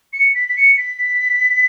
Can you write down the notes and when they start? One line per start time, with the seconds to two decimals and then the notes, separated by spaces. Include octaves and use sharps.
0.12 C#7
0.34 B6
0.48 B6
0.56 C#7
0.77 B6